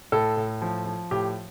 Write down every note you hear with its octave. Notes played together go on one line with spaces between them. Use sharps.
A2 A4
A2
F3
F3
A2 G4